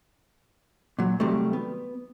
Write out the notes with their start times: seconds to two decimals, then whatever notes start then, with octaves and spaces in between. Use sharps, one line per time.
0.99 A#2 F#3
1.20 C3 D#3 F#3 G3 A3
1.53 B3